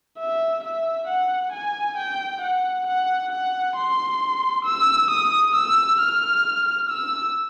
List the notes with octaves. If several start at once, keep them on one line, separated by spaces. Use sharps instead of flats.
E5
E5
F#5
G#5
G5
F#5
F#5
F#5
C6
E6
D#6
E6
F6
E6